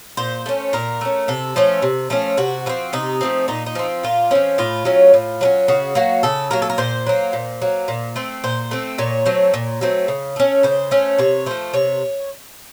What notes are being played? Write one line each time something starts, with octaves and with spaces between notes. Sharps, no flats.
A#2 C5
A3 C#4
A#2 A#4
A3 C#4
C3 A4
F3 A3 C#4
C3
F3 A3 C#4
C3 F#4
F3 A3 C4
C3 D#4
F3 A3 C4
A#2 D#4
D#4
F3 C4
A#2 F4
F3 C4 C#4
A2 F4
F#3 A3 C#4
A2
F#3 A3 C#4
C#3 F#4
F#3 A#3 F#4
C#3 A4
F#3 A#3 A#4
A4
A#4
A#2 C5
F#3 A#3
A#2
F#3 A#3
A#2
A3 C4
A#2 C5
A3 C4
A#2 C#5
F#3 A3 C4
A#2
F#3 A3 C4
C#3
A3 C#4
C#3 C5
A3 C#4
C3 C#5
F3 A3 C5
C3 C#5